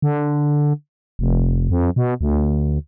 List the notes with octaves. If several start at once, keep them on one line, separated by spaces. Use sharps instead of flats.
D3
F1
F2
B2
D2